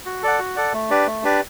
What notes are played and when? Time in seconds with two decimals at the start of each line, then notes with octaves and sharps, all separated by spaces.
0.06 F#4
0.23 A4 D5 F#5
0.39 F#4
0.56 A4 D5 F#5
0.73 A3
0.90 D4 G4 B4 D5
1.07 A3
1.23 D4 G4 B4 D5